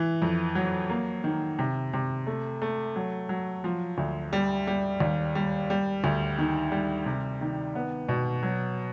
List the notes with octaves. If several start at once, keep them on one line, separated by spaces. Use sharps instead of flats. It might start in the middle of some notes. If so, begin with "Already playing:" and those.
Already playing: E3
F2
F#3
A#3
D#3
C3
C3
A3
A3
F#3
F#3
F3
D2
G3
G3
D#2
G3
G3
D2
D#3
G3
C3
D#3
B3
B2
F#3